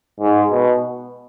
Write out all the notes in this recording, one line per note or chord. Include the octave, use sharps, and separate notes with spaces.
G#2
B2